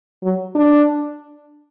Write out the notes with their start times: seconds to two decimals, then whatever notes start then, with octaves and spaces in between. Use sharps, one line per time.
0.23 F#3
0.55 D4